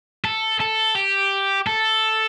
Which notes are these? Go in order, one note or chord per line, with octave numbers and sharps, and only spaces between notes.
A4
A4
G4
A4